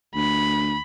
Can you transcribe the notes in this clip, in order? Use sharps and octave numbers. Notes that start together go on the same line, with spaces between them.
D2 B5